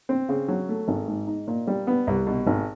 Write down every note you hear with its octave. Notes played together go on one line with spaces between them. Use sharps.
C4
C#3
F#3
A3
G#1
G#2
D#4
A#2
G3
B3
C2
B2
G#1